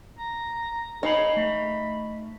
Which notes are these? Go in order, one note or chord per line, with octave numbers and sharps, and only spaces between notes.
A#5
D#4 G#4 C#5 F5 B5
A3 B5